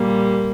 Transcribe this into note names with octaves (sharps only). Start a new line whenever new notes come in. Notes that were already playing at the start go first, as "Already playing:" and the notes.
Already playing: A#2 G3 A#3